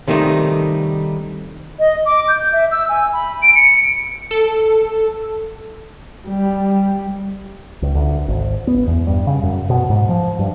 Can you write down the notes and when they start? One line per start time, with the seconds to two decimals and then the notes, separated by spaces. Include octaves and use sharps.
0.08 C3 D#3 G3 A3 D#4
1.79 D#5
2.05 D6
2.28 G6
2.52 E5
2.71 E6
2.89 G#5
3.12 B5
3.42 D7
3.55 C#7
4.31 A4
6.25 G3
7.82 C#2
7.95 D2
8.28 G#1
8.67 B3
8.87 E2
9.07 G2
9.27 C#3
9.43 F#2
9.70 B2
9.90 G#2
10.09 F3
10.39 G2